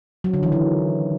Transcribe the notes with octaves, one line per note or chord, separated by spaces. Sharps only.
F#3
D3
E3
D#3